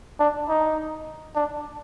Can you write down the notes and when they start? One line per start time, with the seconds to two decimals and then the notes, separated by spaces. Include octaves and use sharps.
0.19 D4
0.49 D#4
1.35 D4